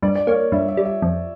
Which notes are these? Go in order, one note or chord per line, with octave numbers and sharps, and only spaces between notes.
G2 D5
D5
A#3 C#5
G2 E5
E5
G3
E5
F2